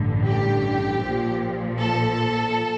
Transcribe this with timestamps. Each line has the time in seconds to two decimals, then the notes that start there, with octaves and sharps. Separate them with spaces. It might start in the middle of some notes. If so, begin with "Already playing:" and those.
Already playing: A1 G2 D3
0.27 G4
1.03 A#1 A#2 F3
1.79 A4